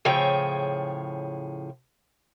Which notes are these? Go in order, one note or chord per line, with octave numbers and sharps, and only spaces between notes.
A2 C#3 F3 G#4 C#5 G5